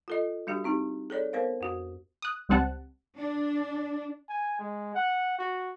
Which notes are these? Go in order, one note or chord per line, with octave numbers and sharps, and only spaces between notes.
F4 A4 D#5
G3 D4 F#4 G4
C4 D#4 G4
G#4 A4 C#5 D5
B3 A#4 C5 F5
F2 F#4
D#6 F#6
C#2 G3 C4 F#5 A5 F#6
D4
G#5
G#3
F#5
F#4